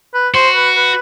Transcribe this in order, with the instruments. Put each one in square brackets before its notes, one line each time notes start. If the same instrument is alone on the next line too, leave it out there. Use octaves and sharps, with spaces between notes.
[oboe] B4
[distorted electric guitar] F#4 [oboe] C5
[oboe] B4
B4